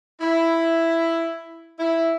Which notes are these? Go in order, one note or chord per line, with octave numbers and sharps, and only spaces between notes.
E4
E4